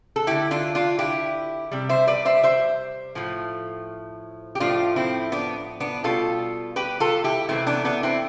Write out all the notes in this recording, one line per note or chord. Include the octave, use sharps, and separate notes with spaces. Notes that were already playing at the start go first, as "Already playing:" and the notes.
A4
D3 A3 E4 G4
D4 F4
D4 F4
E4 G4
C3 G3
C5 E5
B4 D5
C5 E5
C5 E5
A2 F3 A3
G4
A2 F3 A3 D4 F4
C4 E4
B3 D4
B3 D4
B2 G3 F4 A4
G4 B4
F4 A4
E4 G4
C3 E3 A3 C4 E4
B3 D4
B3 D4
C4 E4